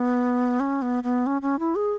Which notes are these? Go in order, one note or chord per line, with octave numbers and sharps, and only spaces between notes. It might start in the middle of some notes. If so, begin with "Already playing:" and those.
Already playing: B3
C#4
B3
B3
C#4
C#4
E4
G#4